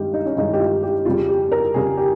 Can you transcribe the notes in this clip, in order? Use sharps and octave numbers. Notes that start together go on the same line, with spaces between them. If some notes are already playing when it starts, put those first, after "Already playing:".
Already playing: G2 D#3 G#3 G4
D#4
C#4
G2 D#3 G#3 D#4
G4
F4
G4
F2 C#3 G3 F4
G4
A#4
F2 C#3 G3 G#4
G4